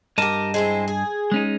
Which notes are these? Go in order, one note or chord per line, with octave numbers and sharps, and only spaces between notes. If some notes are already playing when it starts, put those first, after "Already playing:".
G2 G4 A#4 D#5 A5
G#3 C4 E4
G#4
G#3 C#4 D#4